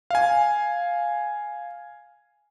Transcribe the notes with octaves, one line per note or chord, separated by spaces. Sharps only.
F5 G#5